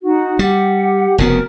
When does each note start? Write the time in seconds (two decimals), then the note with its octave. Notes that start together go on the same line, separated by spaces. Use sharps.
0.02 D#4 F#4
0.39 G3 G4 F#5
1.18 F1 C#3 B3 F#4 A#4